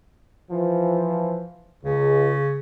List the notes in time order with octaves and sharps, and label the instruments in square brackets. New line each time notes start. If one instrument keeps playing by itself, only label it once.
[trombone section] E3 F3
[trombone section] C#2 [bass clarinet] C#3